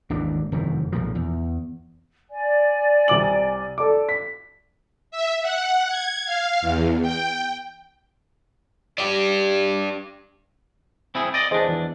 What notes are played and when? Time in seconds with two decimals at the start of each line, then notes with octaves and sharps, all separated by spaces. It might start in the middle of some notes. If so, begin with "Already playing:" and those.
0.10 G#1 D#2 E3 D4
0.52 F1 F#2 D#3 E3
0.92 B1 A#2 F3
1.15 E2
2.30 D5 G#5
3.08 C2 D6 F#7
3.78 A4 D5 D6
4.09 B6
5.11 E5
5.42 F#5
5.89 G#6
6.26 F5
6.61 E2
7.02 G5
8.98 D4 G4
11.15 C4 E4 G#4
11.34 D5 D#5
11.51 E2 D4 G#4 C5 D#5
11.69 E3